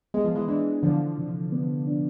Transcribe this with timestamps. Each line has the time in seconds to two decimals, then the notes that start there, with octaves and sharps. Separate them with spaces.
0.14 G#3 B3
0.24 F3
0.35 E3 G#3
0.48 E3 G#3 D4
0.83 D3 E3 F3
1.18 C3
1.52 B3
1.87 D4